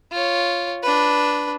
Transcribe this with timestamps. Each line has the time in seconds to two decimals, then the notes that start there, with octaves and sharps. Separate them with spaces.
0.12 F4 C#5
0.83 D4 B4